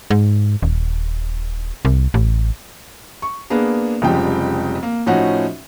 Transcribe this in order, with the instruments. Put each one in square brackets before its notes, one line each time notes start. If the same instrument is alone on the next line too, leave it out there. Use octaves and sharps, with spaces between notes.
[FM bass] G#2
D#1
C2
A1
[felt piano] C#6
A#3 B3 D4 G#4
F1 C#3 F3 G3 G#3 G5
A#3
A2 F3 C#4 D#4 F#4 F#5